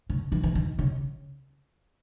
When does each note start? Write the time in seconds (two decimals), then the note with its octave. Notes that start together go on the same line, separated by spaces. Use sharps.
0.10 C#3
0.32 E3
0.43 E3
0.55 D#3
0.79 C#3